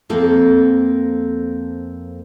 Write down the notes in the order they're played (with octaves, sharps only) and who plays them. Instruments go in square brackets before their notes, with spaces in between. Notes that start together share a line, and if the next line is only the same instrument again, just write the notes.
[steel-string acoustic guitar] F2 A#3 C4 A4 A#4